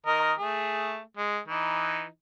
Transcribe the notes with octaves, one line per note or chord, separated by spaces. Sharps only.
D#3 A#4 D#5
A3 G#4
G#3
E3 D#4